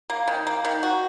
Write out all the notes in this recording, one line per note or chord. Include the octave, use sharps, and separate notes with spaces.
A#3
D#3
A#3
D#3
F#4